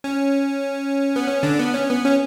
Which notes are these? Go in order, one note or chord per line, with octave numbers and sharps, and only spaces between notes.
C#4
B3
C#4
D3 D4
B3
C#4
B3
C#4